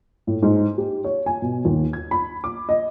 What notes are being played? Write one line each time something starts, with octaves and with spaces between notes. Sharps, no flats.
A2
G#2
G4
C#5
G#5
B2
D#2
G#6
B5
D6
D#5